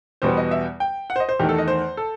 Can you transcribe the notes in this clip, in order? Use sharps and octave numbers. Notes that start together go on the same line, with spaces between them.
E2 B2 G3 B3 C5
D#5
E5
G5
F#5
C5
D#5
C5
E2 D#3 A3 G4
A4
D#5
C5
A4